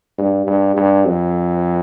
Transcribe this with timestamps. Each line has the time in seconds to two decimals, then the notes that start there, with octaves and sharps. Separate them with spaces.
0.18 G2
0.47 G2
0.76 G2
1.06 F2